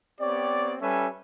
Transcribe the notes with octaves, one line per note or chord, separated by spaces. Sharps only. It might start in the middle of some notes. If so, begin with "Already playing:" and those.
B3 C4 G4 C#5 D5
G3 C#4 A4 B4 E5 G#5